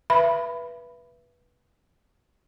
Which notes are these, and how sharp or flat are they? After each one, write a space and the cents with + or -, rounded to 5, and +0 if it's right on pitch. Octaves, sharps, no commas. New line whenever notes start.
B4 -15 E5 +30 B5 +0